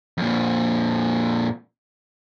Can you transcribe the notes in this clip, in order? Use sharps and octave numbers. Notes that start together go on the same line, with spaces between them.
F2 A#2